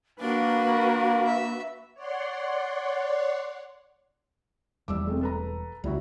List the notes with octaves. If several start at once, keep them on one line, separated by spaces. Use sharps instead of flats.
A#3 D4 F#4 A#4 B4 F5
E5
C#5 D5 F#5 C6
E1 E2 G3 D6 E6
G#3 A3 C4
A4 B4 A#5
C#2 G3 E4 F#4